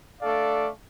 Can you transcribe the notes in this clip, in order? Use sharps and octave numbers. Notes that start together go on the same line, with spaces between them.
A3 D4 A4 D5 F5